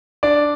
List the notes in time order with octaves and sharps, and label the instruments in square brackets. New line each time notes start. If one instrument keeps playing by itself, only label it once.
[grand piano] D4 D5